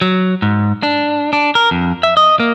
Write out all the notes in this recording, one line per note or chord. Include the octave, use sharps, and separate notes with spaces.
F#3
G#2
D4
D4
A#4
F2
E5
D#5
A#3